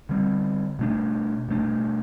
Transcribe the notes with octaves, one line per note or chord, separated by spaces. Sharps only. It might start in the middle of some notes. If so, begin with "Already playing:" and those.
D3 G3 C4
B2 A3 D4
B2 A3 D4